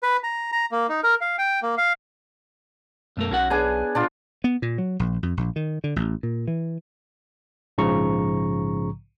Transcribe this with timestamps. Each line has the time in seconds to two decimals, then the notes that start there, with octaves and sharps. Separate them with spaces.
0.03 B4
0.23 A#5
0.52 A#5
0.72 A#3
0.89 D#4
1.04 A#4
1.21 F5
1.38 G5
1.63 A#3
1.78 F5
3.17 B1 F#2 A3 A#4
3.31 B1 C#4 F#4 F#5
3.50 B3 D4 G#4 G#5
3.95 A#2 D4 F4
4.44 B3
4.62 A#2
4.78 F#3
5.00 A#1
5.23 F2
5.37 A#1
5.56 D#3
5.84 D3
5.96 A1
6.23 A#2
6.47 E3
7.78 A#1 G#2 C#3 F3 A#5 C#6